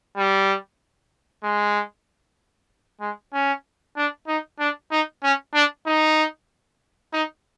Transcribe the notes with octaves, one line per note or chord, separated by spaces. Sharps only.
G3
G#3
G#3
C#4
D4
D#4
D4
D#4
C#4
D4
D#4
D#4